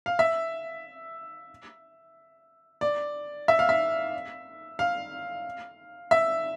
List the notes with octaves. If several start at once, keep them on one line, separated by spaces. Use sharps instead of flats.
F5
E5
D5
E5
F5
E5
F5
E5